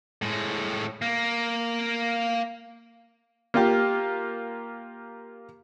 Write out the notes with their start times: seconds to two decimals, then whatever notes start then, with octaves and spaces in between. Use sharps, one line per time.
0.22 A2 G#3
1.02 A#3
3.54 A#3 F4 G4